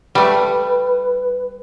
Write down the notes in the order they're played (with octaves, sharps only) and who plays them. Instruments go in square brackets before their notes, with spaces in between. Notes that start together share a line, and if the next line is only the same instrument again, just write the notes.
[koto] G3 A3 [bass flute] B4